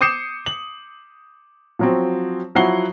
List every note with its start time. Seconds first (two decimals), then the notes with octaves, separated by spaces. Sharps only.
0.01 D6 D#6 G6 C7 C#7 E7
0.46 F#7
1.79 F3 F#3 C4
2.55 F3 F#3 E4 F#5 C7 G7